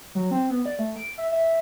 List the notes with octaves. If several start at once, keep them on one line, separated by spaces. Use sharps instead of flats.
F#3
C4
B3
D5
A3
D7
E5
E5